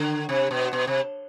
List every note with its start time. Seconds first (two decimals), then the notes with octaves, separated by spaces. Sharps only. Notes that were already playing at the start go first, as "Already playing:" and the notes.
Already playing: D3
0.29 C3
0.51 B2
0.73 B2
0.87 C3